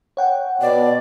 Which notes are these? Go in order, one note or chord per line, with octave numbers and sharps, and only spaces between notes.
C#5 F#5 G5
B2 D5